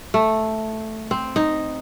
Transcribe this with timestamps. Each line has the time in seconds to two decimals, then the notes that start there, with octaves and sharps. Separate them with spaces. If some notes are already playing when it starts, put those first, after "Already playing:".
0.14 A3
1.11 C4
1.36 D#4